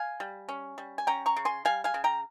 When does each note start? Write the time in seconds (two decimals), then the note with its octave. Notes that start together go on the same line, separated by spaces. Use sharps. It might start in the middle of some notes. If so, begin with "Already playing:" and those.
Already playing: F5 G#5
0.20 G3
0.49 C#4
0.78 G3
0.98 G#5
1.07 C#4 G5 A#5
1.26 A#5 C#6
1.36 C#3
1.45 G#5 C6
1.65 G3 F5 G#5
1.84 F5 G#5
1.94 C#3
2.04 G5 A#5